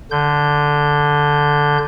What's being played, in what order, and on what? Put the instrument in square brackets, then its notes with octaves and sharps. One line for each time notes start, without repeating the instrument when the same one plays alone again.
[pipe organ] D3 G6